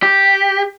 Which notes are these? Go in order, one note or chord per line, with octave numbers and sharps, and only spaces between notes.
G4